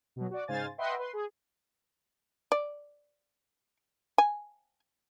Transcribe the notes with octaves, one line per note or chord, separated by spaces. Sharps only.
B2 F#3
F#4 D5
G#2 C#3 C5 F5 G#5 A6
B4 D#5 E5 F#5 G5 C6
B4 C6
G#4
D5
G#5